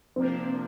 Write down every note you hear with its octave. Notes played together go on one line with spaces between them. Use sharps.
C3 F3 A#3 C4 D4